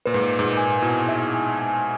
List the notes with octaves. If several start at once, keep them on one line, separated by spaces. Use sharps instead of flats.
A#2 B4
G#2
A#2
B4
G#2
A#2
G#5
B2 E4
E5
G#5
G#5